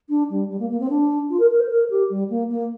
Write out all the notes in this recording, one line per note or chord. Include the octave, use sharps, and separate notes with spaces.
D4
G3
G3
A#3
A#3
C4
D4
F4
A#4
A#4
C5
A#4
G4
G3
A#3
A#3